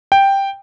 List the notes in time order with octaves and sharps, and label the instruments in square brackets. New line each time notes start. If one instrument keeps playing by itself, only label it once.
[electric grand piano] G5